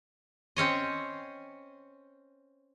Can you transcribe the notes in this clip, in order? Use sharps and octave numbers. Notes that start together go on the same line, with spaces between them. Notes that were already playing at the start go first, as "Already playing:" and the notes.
C4 C#4 C#5 D#5